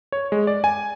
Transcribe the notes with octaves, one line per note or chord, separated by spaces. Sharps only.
C#5
G#3
D5
G#5